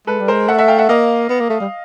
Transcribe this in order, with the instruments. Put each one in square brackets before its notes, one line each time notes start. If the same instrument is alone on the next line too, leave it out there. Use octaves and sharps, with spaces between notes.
[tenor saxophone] G#3 [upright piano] A4 B4
[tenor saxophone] G3
[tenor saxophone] G#3 [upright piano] A#4 C5
[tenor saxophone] A3 [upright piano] E5 F#5
[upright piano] E5 F#5
F5 G5
E5 F#5
[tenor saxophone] A#3 [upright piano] D#5 F5
[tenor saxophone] B3
A#3
A3
G3